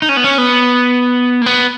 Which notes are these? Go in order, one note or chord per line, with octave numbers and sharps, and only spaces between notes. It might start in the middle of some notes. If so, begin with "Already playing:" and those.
D#4
C#4
B3
C#4
B3
A#3
B3